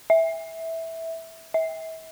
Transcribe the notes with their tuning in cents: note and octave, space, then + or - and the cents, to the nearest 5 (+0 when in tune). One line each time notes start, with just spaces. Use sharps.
E5 -10
E5 -35